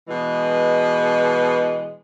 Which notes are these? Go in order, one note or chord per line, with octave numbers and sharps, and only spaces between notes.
B2 E3 G#3